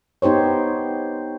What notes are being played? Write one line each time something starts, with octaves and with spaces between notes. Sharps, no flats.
B3 D#4 G4 C5 C#5